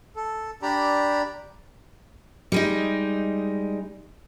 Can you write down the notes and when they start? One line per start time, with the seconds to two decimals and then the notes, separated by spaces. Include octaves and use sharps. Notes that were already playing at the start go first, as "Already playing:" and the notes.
0.16 A4
0.62 D4 G4 D5 A#5 B5
2.52 G3 G#3 D#4